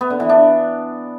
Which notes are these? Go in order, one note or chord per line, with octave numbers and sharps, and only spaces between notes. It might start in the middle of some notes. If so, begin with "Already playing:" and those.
B3
D3
E3
D4